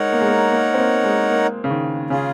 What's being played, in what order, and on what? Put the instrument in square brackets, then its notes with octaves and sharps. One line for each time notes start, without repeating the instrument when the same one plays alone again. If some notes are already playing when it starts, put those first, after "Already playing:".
Already playing: [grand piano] G#3 [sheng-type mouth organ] D#4 A#4 C#5 F#5
[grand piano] A#3
G#3
A#3
A#3
C4
A#3
G#3
A#3
C#3
D#3
[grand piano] C#3 [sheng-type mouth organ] C#4 F4 G#4